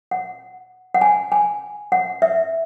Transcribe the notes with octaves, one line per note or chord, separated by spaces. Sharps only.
F#5
F#5
G#5
G#5
F#5
E5